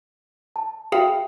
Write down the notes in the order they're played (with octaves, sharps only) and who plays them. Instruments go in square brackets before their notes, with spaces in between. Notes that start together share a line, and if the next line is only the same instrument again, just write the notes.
[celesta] A5
[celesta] F#4 E5 G5 [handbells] G#4 F5